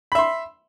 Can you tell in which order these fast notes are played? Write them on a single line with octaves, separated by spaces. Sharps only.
B5 E5 C6